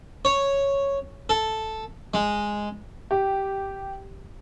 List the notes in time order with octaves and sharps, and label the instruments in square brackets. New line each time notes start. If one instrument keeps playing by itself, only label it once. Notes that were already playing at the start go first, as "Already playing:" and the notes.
[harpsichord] C#5
A4
G#3
[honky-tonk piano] G4